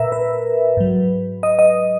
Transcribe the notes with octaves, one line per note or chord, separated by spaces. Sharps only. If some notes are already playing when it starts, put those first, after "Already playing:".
Already playing: A#2 A#4 B4 E5
B4
G#2 F#3
D#5
D#5